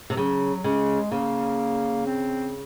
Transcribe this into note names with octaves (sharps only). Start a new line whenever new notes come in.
C3
C#3 F#3
C#3 G#3
C#3 A#3
C4